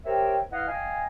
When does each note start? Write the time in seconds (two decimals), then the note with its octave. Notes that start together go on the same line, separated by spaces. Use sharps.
0.05 G4 A#4 C5 C#5 E5 G5
0.52 E4 B4 D#5 F5 F#5
0.68 D#5 F5 G5 G#5